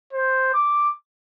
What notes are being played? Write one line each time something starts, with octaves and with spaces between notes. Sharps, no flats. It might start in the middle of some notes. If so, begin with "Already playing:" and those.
C5
D6